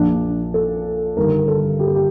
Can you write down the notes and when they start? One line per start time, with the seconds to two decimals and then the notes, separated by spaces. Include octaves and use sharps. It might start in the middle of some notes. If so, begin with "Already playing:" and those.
Already playing: A#1 A#2 F3 D4
0.54 A4
1.17 G1 G2 D#3 A#4
1.48 A4
1.79 G4
1.87 A4
1.95 G4